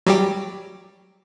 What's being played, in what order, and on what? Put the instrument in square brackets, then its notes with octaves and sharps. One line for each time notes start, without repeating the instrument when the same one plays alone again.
[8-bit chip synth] F#3 G3 G4